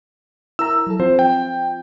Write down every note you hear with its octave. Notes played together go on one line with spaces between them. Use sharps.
E4 A#4 A#5 E6
F#3 A4
F3 C4 F4 C5
G5